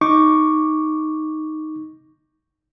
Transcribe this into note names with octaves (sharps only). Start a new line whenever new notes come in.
D#4 C#6 D6